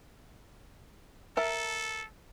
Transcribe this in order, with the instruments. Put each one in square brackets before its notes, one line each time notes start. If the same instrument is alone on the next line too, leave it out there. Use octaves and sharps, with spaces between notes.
[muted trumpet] A4 [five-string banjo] A#4 E5 A5